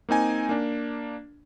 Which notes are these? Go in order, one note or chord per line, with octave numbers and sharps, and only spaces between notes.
A#3 C4 D#4 G#5
A#3 D4